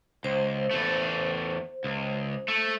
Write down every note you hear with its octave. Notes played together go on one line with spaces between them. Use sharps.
C#2 C5
E2 A3
C#2
A3